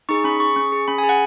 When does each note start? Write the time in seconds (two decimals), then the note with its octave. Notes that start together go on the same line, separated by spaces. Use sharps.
0.09 D#4 G#4 C#6
0.24 C#4 B5
0.40 G#4 C#6
0.56 C#4
0.72 G#4
0.88 C#4 B5
0.98 G#5
1.03 G#4
1.09 F#5